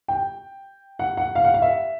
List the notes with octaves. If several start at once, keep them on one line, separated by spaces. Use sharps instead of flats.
G5
F#5
F#5
F5
F#5
F5
E5